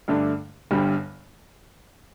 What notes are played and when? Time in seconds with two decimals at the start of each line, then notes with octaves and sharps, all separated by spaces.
0.08 G2 D3 A3 D4
0.71 G1 G2 D3 G3